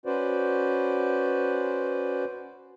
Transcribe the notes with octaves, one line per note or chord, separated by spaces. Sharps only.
C#4 F#4 B4 C5 D5